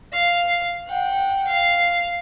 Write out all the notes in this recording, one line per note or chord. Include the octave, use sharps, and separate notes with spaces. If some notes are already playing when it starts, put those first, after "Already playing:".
F5
F#5 G5
F5